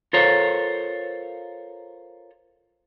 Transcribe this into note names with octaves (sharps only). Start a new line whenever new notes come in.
F4 A4 A#4 C5 C#5